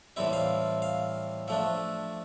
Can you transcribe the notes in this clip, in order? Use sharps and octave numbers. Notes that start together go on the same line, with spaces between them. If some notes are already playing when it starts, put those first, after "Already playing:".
A2 E3 G3 C4 E4 E5
F5
F5
F3 A3 D4 E5